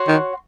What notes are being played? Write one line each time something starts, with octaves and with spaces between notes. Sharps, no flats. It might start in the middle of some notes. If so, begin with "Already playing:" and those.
Already playing: F#4 C#5 F#5 C6
D#3